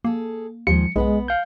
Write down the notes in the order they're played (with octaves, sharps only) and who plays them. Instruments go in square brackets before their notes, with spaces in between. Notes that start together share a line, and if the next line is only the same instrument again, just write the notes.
[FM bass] A#3 [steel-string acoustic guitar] G#4 A4
[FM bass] D#2 [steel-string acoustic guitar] D#3 F3 G#3 [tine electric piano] C#7
[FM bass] B1 [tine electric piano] G#3 [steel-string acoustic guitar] B3 B4 F#5
[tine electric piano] F5 G6